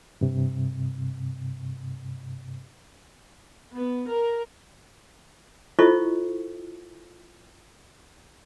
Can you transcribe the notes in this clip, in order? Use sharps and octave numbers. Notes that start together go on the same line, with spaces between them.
G2 C3
B3
A#4
E4 F4 A4 C5 D#5 C#6